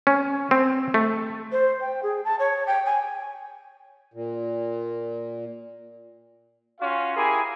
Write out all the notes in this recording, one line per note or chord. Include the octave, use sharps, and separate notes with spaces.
C#4
C4
A3
C5
G5
G#4
A5
C#5
G5
G#5
A#2
C#4 F4 F#4 F5
E4 G4 G#4 A#4 G#5